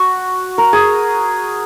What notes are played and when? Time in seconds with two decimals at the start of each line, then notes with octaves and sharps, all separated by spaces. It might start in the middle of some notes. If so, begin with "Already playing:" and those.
Already playing: F#4
0.58 A#4
0.73 G#4